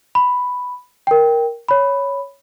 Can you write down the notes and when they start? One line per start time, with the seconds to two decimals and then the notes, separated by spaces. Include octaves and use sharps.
0.15 B5
1.07 A#4 G5
1.68 C#5 B5